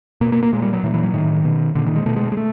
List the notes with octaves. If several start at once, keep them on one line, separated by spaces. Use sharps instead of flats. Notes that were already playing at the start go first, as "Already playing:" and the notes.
B2 A#3
A#3
A#3
A#2 G#3
G3
F#3
A#2 E3
E3
F#3
A2 D#3
B2
A#2 D3
D#3
G#3
B2 A3
G#3
G#3
A3